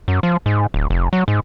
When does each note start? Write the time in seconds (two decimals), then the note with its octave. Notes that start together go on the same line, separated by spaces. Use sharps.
0.08 F#2
0.23 F3
0.46 G#2
0.74 D1
0.90 F1
1.13 F#3
1.28 G#2